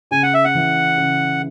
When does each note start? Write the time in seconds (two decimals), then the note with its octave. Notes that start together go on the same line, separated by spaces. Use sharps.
0.11 C#3 G#5
0.23 F#5
0.34 E5
0.45 F#5
0.55 E3
0.98 C#3